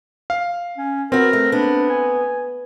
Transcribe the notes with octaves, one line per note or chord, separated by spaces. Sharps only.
F5
C#4
B3 C4 F#4 A#4
A3
B3 D4
G#5